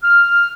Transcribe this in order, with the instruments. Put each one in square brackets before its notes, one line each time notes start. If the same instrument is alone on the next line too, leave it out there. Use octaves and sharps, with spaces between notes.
[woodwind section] F6